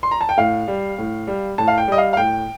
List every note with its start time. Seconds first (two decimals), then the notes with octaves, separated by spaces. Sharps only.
0.03 C6
0.11 A#5
0.21 A5
0.29 G5
0.37 A2 F5
0.68 G3
0.98 A2
1.27 G3
1.58 A2 A5
1.68 F5
1.78 G5
1.88 G3 D#5
1.98 F5
2.13 F5
2.17 A2 G5